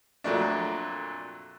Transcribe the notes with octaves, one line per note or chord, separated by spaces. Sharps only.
F2 A#2 F#3 A3 D4